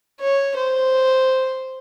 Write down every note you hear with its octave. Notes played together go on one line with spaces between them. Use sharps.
C#5
C5